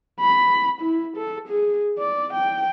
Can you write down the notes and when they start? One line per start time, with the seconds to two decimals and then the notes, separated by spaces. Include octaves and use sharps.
0.20 B5
0.81 E4
1.17 A4
1.48 G#4
1.99 D5
2.34 G5